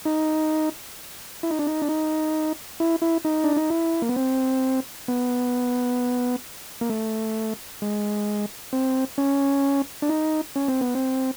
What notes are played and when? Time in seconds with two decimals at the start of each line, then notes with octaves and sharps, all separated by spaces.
0.05 D#4
1.43 E4
1.50 D#4
1.59 D4
1.67 D#4
1.82 D4
1.89 D#4
2.80 E4
3.02 E4
3.25 D#4
3.44 D4
3.56 D#4
3.70 E4
4.02 A#3
4.09 B3
4.16 C4
5.08 B3
6.81 A#3
6.90 A3
7.82 G#3
8.73 C4
9.18 C#4
10.02 D4
10.09 D#4
10.56 C#4
10.68 C4
10.81 B3
10.95 C4